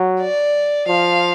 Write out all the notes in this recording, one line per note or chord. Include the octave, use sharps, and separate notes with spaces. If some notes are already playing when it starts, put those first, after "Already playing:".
Already playing: F#3
D5
F3 F5